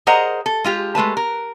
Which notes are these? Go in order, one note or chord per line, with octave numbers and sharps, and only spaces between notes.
G#4 A#4 C5 D#5 F#5 A#5
A4
G#3 F4 G4
G#3 A3 B4 A5
A#4